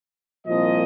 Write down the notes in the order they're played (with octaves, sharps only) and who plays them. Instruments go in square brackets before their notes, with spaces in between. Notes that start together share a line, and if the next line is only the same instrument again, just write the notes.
[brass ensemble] C2 A#2 F3 D#5